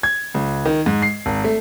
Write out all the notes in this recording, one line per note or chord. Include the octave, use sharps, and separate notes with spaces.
G#6
C#2
D#3
G#2
C7
G#1
A3